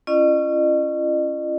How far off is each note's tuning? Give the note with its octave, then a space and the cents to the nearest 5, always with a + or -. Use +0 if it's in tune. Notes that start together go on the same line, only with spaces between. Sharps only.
C#4 +0 F4 -40 D#5 -40